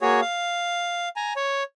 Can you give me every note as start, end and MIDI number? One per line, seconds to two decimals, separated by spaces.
0.01 0.21 58
0.01 0.21 66
0.01 0.21 68
0.01 0.21 73
0.21 1.09 77
1.16 1.33 80
1.16 1.33 82
1.36 1.63 73